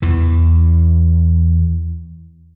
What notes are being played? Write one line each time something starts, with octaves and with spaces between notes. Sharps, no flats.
E2 E3